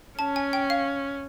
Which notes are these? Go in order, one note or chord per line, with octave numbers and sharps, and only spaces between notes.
C#4 A5
G#5
G5
F5